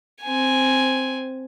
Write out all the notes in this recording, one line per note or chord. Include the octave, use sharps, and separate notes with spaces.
C4 G#5